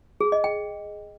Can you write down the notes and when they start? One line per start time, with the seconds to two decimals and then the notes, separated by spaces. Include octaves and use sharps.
0.21 G#4
0.32 D#5
0.44 G5